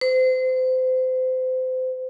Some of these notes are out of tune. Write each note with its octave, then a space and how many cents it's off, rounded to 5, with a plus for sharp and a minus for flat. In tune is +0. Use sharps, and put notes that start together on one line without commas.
C5 -30